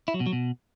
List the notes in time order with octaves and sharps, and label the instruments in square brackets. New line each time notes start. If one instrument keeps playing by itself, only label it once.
[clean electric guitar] E4
F#3
B2
F#3
B2